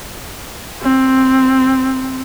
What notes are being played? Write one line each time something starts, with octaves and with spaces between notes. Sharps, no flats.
C4